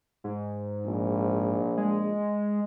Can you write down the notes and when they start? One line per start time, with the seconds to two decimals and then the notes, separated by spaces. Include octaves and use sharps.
0.24 G#2
0.86 A#1
1.77 G#3